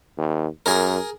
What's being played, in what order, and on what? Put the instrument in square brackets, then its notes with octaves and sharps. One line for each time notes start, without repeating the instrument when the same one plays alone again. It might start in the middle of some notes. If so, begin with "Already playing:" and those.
[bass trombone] D#2
[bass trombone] F#2 [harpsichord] G#4 A#4